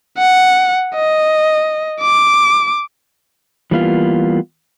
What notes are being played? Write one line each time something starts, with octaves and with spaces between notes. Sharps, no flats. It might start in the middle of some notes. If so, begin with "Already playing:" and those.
F#5
D#5
D6
E3 G3 A#3 B3 D4 F4